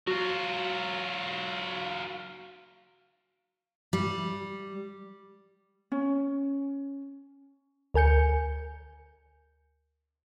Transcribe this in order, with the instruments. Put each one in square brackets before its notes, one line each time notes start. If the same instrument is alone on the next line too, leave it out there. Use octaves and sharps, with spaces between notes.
[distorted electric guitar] F#3 F4 [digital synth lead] F#4
[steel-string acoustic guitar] G3
[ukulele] C#4
[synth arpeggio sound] D2 A#4 G#5 G6 C#7